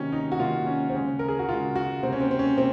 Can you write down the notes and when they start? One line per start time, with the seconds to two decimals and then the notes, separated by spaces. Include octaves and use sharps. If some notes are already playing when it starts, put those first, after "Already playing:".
Already playing: C3 D#3 F#3 A#3 C#4
0.12 D#4
0.32 F#4
0.39 C3 D#3 F#3 A#3 F4
0.67 C#4
0.89 C4
0.94 C#3 G#3 C#4
1.19 A#4
1.28 G#4
1.39 F#4
1.49 C#3 G#3 F4
1.76 F#4
2.03 C3 F#3 A#3 C4
2.12 C#4
2.20 C4
2.31 C4
2.39 C#4
2.56 C3 F#3 A#3 C4